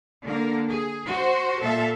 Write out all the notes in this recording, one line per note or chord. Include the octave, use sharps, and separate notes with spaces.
D3 A#3 A#4
G#4
F#4 C5
A#2 A4 E5 F5